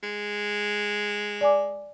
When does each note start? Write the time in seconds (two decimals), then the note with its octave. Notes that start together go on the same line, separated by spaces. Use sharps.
0.03 G#3
1.41 D5 G#5 D6